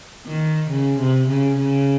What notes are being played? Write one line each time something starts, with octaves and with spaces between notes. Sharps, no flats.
D#3
C#3
C3
C#3
C#3